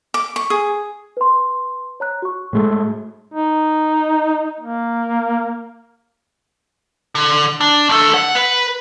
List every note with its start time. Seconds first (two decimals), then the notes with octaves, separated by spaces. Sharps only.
0.14 D6
0.36 C#6
0.50 G#4
1.17 B4 C6
2.00 C#5 A#5 F#6
2.22 F#4 C#6
2.53 A2 G#3 A3
3.34 D#4
4.60 A#3
7.15 D3
7.61 D4
7.89 D#2 A4
8.14 F#5
8.35 B4